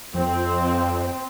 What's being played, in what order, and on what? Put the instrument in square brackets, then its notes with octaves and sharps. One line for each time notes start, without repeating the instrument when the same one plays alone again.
[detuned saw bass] F2 [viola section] C4